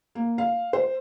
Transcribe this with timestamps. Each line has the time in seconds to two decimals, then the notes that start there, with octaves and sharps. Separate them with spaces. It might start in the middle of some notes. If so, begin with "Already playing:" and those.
0.15 A#3
0.38 F5
0.73 C5